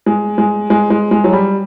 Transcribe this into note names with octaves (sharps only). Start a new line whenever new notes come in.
G#3
G#3
G#3
G#3
G#3
F#3
G3